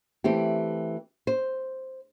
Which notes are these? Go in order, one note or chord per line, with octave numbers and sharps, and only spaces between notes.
E3 A3 C4 G4
C5